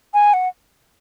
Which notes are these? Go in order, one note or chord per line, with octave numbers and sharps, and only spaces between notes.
G#5
F#5